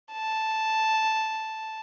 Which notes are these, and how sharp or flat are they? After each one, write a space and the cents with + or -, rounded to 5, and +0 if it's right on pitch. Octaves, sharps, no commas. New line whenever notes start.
A5 +0